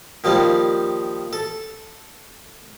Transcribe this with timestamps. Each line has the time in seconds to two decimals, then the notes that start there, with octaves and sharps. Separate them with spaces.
0.24 D#3 F3 G3 A#3
1.33 A4